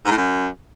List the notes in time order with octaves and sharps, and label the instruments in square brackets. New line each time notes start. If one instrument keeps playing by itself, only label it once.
[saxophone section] G#2
A2
F#2